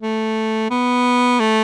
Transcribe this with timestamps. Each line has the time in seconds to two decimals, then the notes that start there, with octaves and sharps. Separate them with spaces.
0.01 A3
0.70 B3
1.40 A3